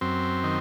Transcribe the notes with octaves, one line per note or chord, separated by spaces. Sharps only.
F#2 C4
D#3